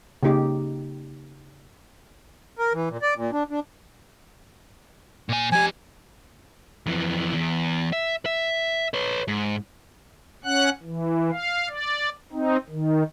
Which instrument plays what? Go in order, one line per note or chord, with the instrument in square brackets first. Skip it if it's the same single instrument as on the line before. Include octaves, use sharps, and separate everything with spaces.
[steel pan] C#3 A#3 D#4 G4
[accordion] A#4
E3
A#2
D5
A#2
D4
D4
[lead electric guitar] A#2 G#5
[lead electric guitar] F3 G4 [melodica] G#5
[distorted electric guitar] F2 E3
E2
E5
E5
B4 C#5
G#2
[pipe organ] C#4 F#5 F#6
E3
F5
D5
C4 D#4
D#3